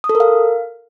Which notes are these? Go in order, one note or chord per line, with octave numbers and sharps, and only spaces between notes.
D#6
A4
A#4
F5